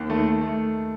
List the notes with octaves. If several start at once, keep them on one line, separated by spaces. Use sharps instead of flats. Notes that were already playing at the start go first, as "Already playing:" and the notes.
Already playing: D#2
D#3 A3
D#3
A3